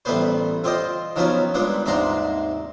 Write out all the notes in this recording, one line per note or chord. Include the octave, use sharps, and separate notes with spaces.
A1 G3 A3 B3 B4 C5
C4 F4 G4 C5 D#5 G5
D#3 F3 F#3 B3 C#4 B4
A#2 G3 G#3 B3 D4
D#2 G#2 C3 D4 A#5 C6